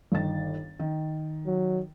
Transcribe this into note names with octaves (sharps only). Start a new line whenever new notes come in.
G1 D#3 A6
D#3
F#3